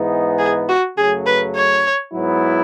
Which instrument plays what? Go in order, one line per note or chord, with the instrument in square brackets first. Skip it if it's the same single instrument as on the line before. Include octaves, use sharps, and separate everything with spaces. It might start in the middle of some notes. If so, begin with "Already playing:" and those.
Already playing: [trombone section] G#2 E3 B3 D#4
[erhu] G#4
F#4
[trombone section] F#2 C#3 F#3 A3 [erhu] G#4
[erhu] B4
C#5
[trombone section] G#2 F#3 B3 E4